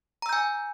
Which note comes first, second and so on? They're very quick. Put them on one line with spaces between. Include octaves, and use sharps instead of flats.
A#5 E6 G6 G#5